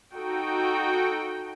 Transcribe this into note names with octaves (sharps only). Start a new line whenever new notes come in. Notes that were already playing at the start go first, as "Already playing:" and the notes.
D#4 F#4 A4 G5